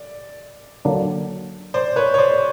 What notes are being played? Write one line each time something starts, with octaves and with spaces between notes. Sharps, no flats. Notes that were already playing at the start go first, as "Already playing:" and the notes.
Already playing: D5
D3 F#3 A#3 D4
C5 D5
B4 C#5
C#5
C5 D5